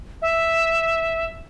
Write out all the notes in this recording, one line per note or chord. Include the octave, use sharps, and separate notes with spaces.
E5